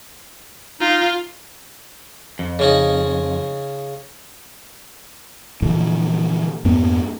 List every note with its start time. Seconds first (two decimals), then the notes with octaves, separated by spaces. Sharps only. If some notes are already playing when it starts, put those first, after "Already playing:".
0.81 D#4 F4
2.39 F2
2.59 C#3 C#4 D#4
5.62 A#2 D3 E3 F3
6.65 F2 G#2 A#3 B3